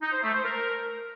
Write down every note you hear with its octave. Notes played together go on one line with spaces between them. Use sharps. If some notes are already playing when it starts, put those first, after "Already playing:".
D#4
C5
A3
C5
A#4